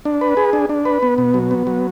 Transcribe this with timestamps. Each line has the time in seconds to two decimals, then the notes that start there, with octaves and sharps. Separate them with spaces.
0.05 D4
0.21 B4
0.37 G#4
0.53 D4
0.69 D4
0.85 B4
1.03 B3
1.18 B2
1.34 F#3
1.51 B3
1.67 F#3